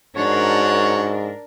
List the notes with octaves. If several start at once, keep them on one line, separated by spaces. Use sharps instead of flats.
G#2 D4 F#4 A#4 C#5